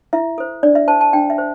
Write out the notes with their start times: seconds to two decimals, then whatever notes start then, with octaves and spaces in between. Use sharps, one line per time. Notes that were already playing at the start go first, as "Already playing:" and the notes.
0.13 E4 E5
0.38 A4 C5
0.63 D4 D5
0.75 E5
0.88 C5 A5
1.01 A5
1.13 D4 G5
1.30 E5
1.38 C5